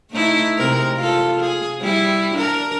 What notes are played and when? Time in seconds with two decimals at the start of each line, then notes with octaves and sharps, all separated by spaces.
0.11 A3 D#4 E4
0.57 C3 G#3 A#4
0.97 F4 A4
1.40 G#4
1.81 G3 E4
2.34 D4 A#4